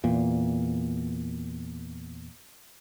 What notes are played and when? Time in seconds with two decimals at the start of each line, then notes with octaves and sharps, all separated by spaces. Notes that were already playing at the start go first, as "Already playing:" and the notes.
0.04 E2 A#2